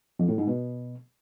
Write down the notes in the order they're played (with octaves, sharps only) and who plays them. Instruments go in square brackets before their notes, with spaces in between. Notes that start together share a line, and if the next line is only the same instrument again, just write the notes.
[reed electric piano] F2
A2
G#2
B2